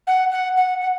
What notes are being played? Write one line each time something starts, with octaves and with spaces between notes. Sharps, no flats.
F#5
F#5
F#5
F#5